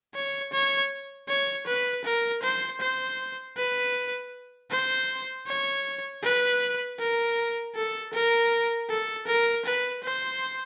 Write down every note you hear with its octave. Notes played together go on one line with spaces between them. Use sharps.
C#5
C#5
C#5
B4
A#4
C5
C5
B4
C5
C#5
B4
A#4
A4
A#4
A4
A#4
B4
C5